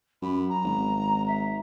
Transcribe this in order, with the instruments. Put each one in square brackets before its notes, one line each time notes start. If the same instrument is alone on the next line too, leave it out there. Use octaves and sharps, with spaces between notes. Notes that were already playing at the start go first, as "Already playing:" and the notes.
[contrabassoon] F#2 [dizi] B5
[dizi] A#5
[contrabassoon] G#1
[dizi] E5